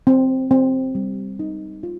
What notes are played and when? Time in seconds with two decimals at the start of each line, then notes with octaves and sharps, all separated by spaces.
0.07 C4
0.51 C4
0.95 G3
1.39 D#4
1.83 F4